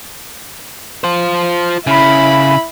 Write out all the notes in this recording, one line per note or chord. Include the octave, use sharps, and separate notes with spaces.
F4 C5
C#3 E4 B5